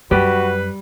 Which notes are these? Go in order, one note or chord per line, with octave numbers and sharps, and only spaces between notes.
F#2 G3 F#4 B4